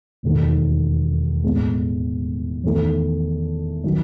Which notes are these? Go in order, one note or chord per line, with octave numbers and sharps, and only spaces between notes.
E1 D#2 D#3 A3 D#4
A2 G#3 B3
E2 D#3 A3
D#3 F#3